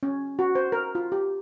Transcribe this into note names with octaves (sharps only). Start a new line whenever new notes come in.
C#4
F#4
C5
A#4
F4
G4